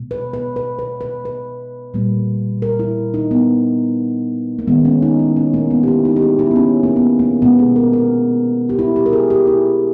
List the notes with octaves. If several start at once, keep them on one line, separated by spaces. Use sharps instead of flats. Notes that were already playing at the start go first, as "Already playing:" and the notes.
Already playing: B2 G#3
B4
B4
B4
B4
B4
B4
A#2 G3 A#3
A#4
E4
D#4
B3
A#3
D#3 G#3 B3
C#4
D#4
E4
C#4
A#3
B3
G4
E4
D#4
G4
G#4
E4
B3
C#4
A#3
B3
A#3
B2 G#3 B3
G#4
A#4
A#4
G4
E4
G4
A#4
G#4
G4
E4